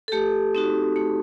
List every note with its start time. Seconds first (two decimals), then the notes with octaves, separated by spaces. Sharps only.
0.08 A4
0.12 A3 G4
0.55 C4 D#4 F#4
0.96 A3